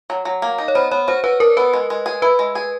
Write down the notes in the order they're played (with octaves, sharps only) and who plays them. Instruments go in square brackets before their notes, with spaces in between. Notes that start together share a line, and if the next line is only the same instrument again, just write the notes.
[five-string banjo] F#3
F#3
A#3
D#4
[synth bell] C#5
[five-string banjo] B3 [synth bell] C5
[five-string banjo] B3 [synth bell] C#5
[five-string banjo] F#4 [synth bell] C5
[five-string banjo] F#4 [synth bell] B4
[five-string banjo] D4 [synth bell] A#4
[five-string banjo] B3 [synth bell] B4
[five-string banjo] G#3
G#3
G#4
[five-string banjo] E4 [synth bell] B4
[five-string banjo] G#3
G#4